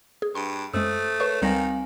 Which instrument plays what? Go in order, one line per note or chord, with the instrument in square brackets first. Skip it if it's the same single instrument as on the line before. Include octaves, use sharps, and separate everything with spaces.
[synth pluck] G#4
[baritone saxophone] G2 [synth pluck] C6
[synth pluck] F#2 G#3 [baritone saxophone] A3 [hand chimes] C5 D#6 E6
[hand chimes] A#4 [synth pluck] B4 C#5 C#6
[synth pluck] C#2 G3 A#6 [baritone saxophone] D#3 [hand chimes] C4 F5 G#5